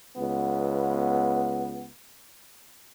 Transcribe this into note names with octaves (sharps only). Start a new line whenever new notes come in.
C#2 B3